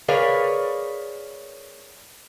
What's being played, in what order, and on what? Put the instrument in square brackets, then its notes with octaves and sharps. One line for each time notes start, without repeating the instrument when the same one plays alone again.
[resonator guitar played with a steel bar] G#4 A#4 B4 C#5 D5 F5